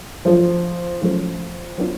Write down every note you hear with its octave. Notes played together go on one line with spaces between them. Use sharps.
F3 F#3 A3 D4 F4
A2 F3 F#3 A3 C#4
F#3 B3 D4 F4